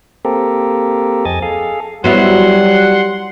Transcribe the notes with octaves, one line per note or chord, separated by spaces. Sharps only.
A#3 C4 G4 A4 A#4
F2 D#5 G#5 A6
G#4 A4 F5
F#3 G3 B3 E4 F#5 C6